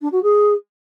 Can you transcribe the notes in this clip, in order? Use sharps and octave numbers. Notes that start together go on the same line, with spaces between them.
D4
F#4
G#4